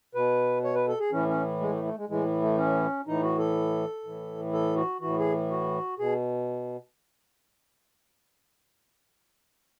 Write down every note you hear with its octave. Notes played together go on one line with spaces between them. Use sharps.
B2 B4
C#5
B4
A4
G#4
A2 E3 C#4
C#4
G#3
A3
A3
G#3
A2 E3 G#3
A3
C#4
A2 E3 D#4
F#4
A4
A2 E3
A4
F#4
A2 E3 F#4
G#4
F#4
B2 G#4